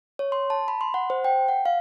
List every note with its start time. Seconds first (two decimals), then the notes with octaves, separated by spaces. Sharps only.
0.19 C#5
0.32 C6
0.50 A5
0.68 B5
0.81 C6
0.94 F#5
1.10 C5
1.25 G5
1.48 F#5
1.65 F5